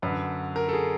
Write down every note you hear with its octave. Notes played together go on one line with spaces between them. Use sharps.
F#2 D3 B4
A#4
A4
G#4